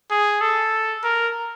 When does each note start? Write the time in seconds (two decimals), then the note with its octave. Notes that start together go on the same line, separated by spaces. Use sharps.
0.11 G#4
0.41 A4
1.03 A#4